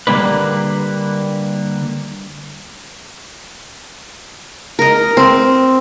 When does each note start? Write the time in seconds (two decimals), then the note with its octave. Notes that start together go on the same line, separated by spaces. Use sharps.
0.07 D3 G3 A#3 D4 B4
4.79 A#4 D#5
5.17 C4